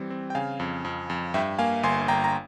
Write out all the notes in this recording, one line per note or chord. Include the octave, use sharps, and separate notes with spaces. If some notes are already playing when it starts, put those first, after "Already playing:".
Already playing: E3 G3 C4
C4
G5
C#3 F5 G#5
F2
F2
F2
G2 E5 G5
A#3 F5 G#5
G1 G#5 C6
G1 G5 A#5
A#5